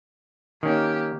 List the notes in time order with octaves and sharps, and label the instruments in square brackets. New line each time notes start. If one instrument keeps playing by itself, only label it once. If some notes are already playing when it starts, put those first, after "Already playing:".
[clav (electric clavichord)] D#3 C#4 [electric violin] A#3 G4